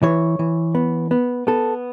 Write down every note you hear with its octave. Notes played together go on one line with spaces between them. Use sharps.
E3 C#5
E3
B3
B3
B3 A4